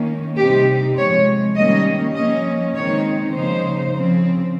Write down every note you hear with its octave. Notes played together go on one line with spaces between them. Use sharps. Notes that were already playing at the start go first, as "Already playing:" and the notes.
Already playing: D#3 A#3 C#4
C3 G3 C4 D#4 G4
C3 F3 G#3 C#5
D#3 G3 A#3 C#4 D#5
F3 A#3 C#4 D#5
D#3 G#3 C4 D#4 C#5
C#3 F3 A#3 D#4 C5
C#3 F3 C4